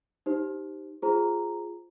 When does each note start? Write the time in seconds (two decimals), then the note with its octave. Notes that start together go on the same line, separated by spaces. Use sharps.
0.26 D#4 G4 C5
1.02 F4 G#4 C5 A#5